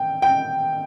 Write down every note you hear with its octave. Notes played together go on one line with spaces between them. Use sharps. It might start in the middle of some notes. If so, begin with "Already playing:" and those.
Already playing: G5
G5